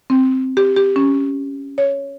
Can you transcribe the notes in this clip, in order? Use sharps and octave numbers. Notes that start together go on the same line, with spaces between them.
C4
G4
G4
C#4
C#5